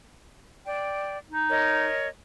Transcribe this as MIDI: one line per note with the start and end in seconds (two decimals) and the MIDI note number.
0.66 1.18 74
0.66 1.18 79
1.30 1.88 63
1.50 2.08 70
1.50 2.08 73
1.50 2.08 75